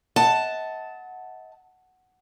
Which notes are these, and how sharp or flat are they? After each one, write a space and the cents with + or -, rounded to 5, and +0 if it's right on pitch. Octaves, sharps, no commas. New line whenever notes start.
D#5 +45 F#5 +0 A5 +0